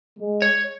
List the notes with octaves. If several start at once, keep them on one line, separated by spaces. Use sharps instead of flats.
G#3
C#5